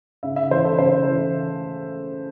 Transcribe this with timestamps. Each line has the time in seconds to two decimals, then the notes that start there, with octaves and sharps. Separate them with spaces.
0.23 C#3 E5
0.36 E5
0.51 E3 C5
0.65 A4
0.78 C#3 C5
1.06 E3